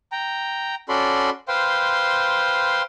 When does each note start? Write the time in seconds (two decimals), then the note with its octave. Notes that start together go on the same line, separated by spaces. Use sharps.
0.12 G5 A#5
0.89 C#4 F#4 A4 D5 B5 C6
1.48 B4 C5 F5 G5 C6